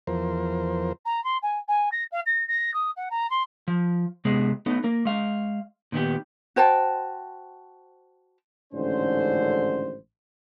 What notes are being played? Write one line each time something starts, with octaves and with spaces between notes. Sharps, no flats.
E2 F3 A#4 C5
A#5
C6
G#5
G#5
A#6
F5
A#6
A#6
D#6
F#5
A#5
C6
F3
C3 G#3 B3 G#4
A3 B3 D#4
A#3 A#4
G#3 F5
A#2 D#3 B3 G4
F#4 C5 G5 A5
A1 G#2 D3 D#3 C#4 C5